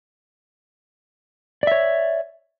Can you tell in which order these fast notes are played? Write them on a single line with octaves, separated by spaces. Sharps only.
D5 E5 C#5